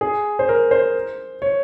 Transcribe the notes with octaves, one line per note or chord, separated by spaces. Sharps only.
G#4
C5
A#4
C5
C#5